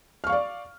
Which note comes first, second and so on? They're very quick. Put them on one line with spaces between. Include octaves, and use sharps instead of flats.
F6 C#6 F5 D5